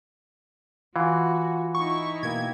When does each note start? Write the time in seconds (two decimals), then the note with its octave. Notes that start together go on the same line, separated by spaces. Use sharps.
0.96 E3 F4 F#4 F5 F#5
1.75 D#4 E4 C#6
2.23 B2 A#3 G5 G#6